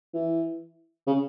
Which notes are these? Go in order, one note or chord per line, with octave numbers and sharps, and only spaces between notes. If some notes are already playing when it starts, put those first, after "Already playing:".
E3
C#3